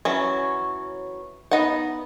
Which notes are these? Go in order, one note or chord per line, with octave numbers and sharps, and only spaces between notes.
E3 F#3 C#4
B3 D#4 F#5